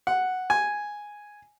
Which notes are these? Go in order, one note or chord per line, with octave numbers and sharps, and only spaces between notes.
F#5
G#5